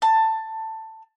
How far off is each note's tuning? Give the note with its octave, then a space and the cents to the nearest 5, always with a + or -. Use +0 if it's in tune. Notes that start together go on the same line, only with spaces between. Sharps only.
A5 +15